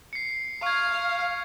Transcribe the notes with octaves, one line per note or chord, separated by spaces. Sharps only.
C7 C#7
F5 C#6 G#6